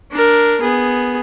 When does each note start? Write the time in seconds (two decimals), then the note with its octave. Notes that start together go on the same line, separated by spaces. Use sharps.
0.12 D4 A#4
0.61 B3 G#4